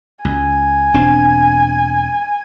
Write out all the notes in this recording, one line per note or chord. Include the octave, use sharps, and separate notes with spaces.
C#2 G#5
E1 C4 D4